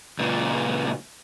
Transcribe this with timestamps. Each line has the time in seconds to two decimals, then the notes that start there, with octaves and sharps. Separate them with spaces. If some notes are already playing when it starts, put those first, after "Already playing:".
0.19 C#2 A#2